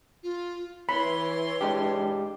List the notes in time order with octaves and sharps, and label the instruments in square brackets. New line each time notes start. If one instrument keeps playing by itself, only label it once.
[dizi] F4
[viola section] E3 C6 [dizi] C#5 [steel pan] B5
[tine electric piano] G#3 D4 G4